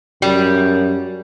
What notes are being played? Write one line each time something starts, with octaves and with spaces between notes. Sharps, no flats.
F#2 G3